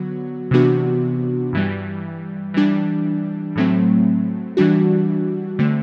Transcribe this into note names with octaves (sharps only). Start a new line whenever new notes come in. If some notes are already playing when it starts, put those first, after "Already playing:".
Already playing: D3 F#3 B3 F#4
C3 E3 B3 D4 F#4
G2 E3 G3
E3 G3 D4
A2 F#3 A3 C4
E3 G3 D4 F#4
D3 A3 C4